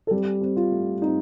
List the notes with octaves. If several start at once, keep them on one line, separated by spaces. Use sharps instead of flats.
A4
G3 C4 G4
C4
F4
A3
C4 D#4